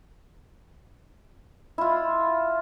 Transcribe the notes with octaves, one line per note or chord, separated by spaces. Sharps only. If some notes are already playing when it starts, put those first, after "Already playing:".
E4 F4